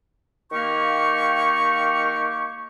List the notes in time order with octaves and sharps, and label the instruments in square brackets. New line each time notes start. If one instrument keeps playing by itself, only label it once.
[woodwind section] D#3 A#3 G4 F5 C#6